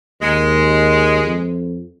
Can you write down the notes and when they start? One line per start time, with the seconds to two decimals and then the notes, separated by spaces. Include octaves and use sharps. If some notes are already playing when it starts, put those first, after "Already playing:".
0.21 D#2 G#3
1.25 F2